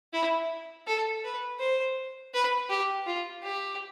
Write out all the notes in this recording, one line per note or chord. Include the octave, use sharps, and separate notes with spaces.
E4
A4
B4
C5
B4
G4
F4
G4